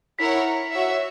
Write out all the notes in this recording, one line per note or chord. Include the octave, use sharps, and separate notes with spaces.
E4 A#4 C#5 F#5 B6
F#4 C#5 E5